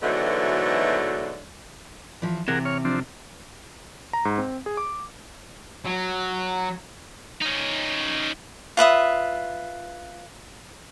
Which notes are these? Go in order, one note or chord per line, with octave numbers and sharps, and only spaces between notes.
G#2 B2 D3 E3 F#3 A3
E3 F3
C3 E3 G#4 A#4 F#5
C#5 F6
F3 C4 D4
A#5
G#2
C4
G#4
D6
F#3
C#4 D#4
F4 B4 E5 D#6